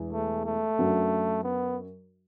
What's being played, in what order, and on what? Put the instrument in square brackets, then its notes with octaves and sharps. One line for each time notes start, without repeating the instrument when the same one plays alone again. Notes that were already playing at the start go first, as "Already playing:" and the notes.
Already playing: [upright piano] E1 E2 E3
[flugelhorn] A3
A3
[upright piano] F#2 F#3 D4 F#4
[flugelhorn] B3